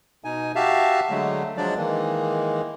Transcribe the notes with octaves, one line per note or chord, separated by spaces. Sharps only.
B2 D#4 G#5
F#4 G4 E5 F5 A5
D3 F#3 G#3 A3
F3 F#3 G#3 D4 D5
D#3 E3 G#3 A#3